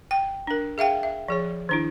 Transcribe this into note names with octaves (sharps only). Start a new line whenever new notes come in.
G5
D4 A#4
G#4 E5 F5 G5
E5
F3 G#4 C#5
D#3 D4 E4